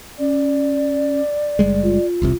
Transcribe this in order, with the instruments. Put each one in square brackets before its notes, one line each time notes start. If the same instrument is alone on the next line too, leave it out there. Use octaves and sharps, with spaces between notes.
[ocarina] C#4 [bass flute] D5
[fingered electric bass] F#1 G3 G#3
[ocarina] F4
[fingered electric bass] E1 C2 C3